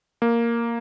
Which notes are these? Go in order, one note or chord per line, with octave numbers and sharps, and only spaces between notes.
A#3